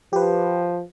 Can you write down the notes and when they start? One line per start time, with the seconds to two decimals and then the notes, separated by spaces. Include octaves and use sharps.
0.13 F3 G4 B4